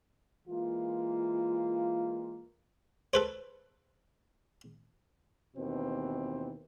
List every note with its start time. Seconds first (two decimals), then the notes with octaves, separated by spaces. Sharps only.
0.48 E3 G#3 A#3 F4
3.14 A4 B4 C5
5.57 D#2 B2 E3 C4